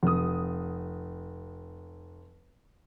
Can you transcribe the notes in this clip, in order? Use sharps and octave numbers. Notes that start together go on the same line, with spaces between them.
F1 D#6